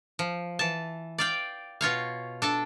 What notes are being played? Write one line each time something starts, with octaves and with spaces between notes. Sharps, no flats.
F3
E3 A5
D5 F5 G5
B2 F4 C#5 F5
D4 A4 A5